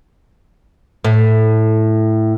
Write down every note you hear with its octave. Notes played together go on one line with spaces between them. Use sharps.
A2